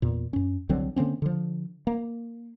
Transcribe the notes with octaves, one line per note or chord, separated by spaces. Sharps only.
E2 A#2
F#2 C#4
C2 D3 F#3 C4
D3 A#3 C4 C#4
D3 F3
A#3